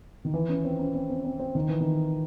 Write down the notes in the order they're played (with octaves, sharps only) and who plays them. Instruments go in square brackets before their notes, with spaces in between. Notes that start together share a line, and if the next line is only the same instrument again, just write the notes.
[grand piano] D#3
E3
C#4
C4
C#4
C4
C4
C4
C4
D#3
E3
D#3